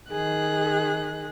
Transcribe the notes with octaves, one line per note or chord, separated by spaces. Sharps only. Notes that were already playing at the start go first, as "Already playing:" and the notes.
D#3 G#4 F#6